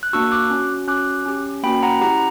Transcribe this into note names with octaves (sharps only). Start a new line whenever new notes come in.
F#6
A#3 D4 F#4 C#6 E6
D6 F#6
C#4 F#4
C#4 F#4 D6 F#6
C#4 G4
A#3 C#4 F#4 G5 B5
F#5 A#5
C#4 E4 G4 F#5 A#5